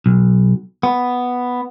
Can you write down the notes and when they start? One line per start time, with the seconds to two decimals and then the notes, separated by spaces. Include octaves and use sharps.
0.06 B1
0.83 B3